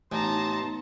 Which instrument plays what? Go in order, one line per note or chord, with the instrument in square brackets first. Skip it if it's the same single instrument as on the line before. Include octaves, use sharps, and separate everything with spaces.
[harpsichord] A1 [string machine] B3 D#4 [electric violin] A5 A#5 [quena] C6